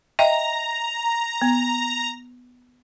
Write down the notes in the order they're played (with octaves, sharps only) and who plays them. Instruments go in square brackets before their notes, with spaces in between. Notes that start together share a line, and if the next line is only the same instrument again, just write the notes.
[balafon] D#5 E5 G5 [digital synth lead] A#5
[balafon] B3